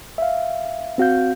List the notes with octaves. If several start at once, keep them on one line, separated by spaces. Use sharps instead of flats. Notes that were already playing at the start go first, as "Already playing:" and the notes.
E5 F5
C4 F#4 F5 G6